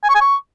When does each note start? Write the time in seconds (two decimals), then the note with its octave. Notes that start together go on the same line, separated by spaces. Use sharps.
0.03 G#5
0.09 C#6
0.15 G#5
0.21 C#6